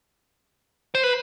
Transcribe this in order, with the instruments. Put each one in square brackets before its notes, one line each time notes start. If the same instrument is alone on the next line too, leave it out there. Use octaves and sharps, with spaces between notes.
[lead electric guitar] C5
B4